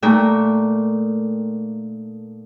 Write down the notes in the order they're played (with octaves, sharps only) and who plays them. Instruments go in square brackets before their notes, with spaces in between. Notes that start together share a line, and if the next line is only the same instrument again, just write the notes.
[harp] A#2 A3 D#4 A#4 G5